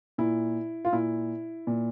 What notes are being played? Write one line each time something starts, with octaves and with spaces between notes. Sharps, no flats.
A#2 E4
F4
A#2 E4
A#2